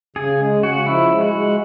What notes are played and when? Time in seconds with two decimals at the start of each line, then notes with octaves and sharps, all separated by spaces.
0.16 C#3 G#4
0.40 G#3
0.63 C#3 F#4
0.86 F3 E4
1.10 G#3
1.21 F#4
1.33 G#3